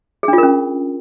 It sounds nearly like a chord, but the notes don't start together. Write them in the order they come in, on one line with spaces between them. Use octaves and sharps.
G#4 D4 F4 A#4 C#4